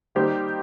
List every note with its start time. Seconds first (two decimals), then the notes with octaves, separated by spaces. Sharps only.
0.15 D#3 G3 A#3 D#4 G4 C5